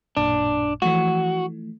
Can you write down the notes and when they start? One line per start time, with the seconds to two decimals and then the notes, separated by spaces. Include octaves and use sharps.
0.17 A1 F#2 A#2 D4
0.82 E3 F3 A3 F#4